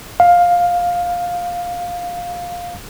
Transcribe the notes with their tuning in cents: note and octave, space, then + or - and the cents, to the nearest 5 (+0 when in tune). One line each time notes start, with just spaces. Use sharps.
F5 +10